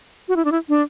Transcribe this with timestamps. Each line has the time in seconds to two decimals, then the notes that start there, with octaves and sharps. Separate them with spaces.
0.28 F#4
0.36 E4
0.45 D4
0.52 E4
0.69 D4